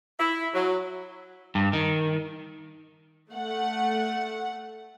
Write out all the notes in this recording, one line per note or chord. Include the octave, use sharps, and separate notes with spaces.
E4
F#3
G2
D#3
A3 F#5